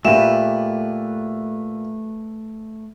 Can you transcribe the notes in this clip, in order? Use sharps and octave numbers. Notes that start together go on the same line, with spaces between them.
A#2 A3 F#4 G4 B4 E5 E7